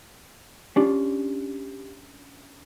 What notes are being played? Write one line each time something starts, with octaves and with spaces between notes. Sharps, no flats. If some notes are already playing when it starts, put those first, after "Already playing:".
C#4 D4 F4 G4